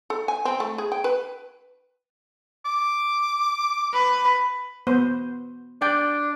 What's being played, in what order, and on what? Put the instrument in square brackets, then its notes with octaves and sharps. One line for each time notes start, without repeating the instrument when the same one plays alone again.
[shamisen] A4
G#5
C4
A3
G#4
G5
B4
[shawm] D6
[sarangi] B4
[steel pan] B3 C5
[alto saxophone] D4 [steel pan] D5 G5